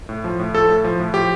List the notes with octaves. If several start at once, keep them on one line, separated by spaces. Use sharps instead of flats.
A2
F3
A2
F3 A4
A2
F3
A2
F3 G4